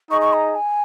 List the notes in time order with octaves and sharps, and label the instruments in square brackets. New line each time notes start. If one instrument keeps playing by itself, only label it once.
[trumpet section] D#4 G#4 D#5 [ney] C#6
[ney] C#6
A#5
G#5